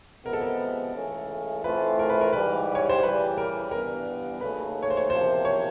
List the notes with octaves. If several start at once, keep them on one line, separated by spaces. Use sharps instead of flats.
C3 F3 G#3 B3 A#4
A4
A#4
C#2 C#3 E3 A3 C#4
A2 E3 A3 C4 F4 B4
A#4
B4
A#4
G#2 E3 G3 B4
C#5
C5
C#3 E3 G3 B4
A#4
G2 E3 G3 B3 A#4
D#2 C#3 F#3 A3 B4
C#5
C5
C#5
E2 C3 F3 A#3 C5
C#5